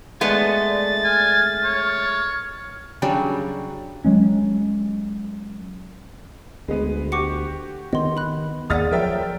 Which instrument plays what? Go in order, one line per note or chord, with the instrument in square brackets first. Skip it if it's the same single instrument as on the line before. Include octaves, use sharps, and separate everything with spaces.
[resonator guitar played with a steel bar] G#3 A3 B3 [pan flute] D5 [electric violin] A6
[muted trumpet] G#5 [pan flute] F6
[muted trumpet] C#5
[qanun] C#3 F#3 G3 D4
[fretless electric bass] F#3 G#3 C#4
[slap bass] D2 [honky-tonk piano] G#3 B3
[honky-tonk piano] F#4 G4 [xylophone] C#6 D6 C#7
[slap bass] D#3 B3 [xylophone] D#5 C6
[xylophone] B5 F#6
[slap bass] D#2 A#3 [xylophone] G#4 D5 F#5 [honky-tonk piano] D#6 F6 A6
[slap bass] F3 F#3 [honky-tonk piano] A#4 E5 G5